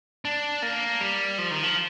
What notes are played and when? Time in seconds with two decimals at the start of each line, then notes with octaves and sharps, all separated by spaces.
0.25 D4
0.62 A#3
1.01 G3
1.38 F3
1.51 D#3
1.63 F3